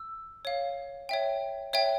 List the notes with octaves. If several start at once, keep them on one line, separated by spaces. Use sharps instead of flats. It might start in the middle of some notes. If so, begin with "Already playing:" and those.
Already playing: E6
C#5 F5
C#5 E5 G5
C#5 E5 G5